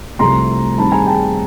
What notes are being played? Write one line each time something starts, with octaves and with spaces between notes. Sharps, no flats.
C2 C3 F3 A3 C4 A#5 C6
G2 D#3 G3 C4 A5 B5
G#5 A#5
G5 A5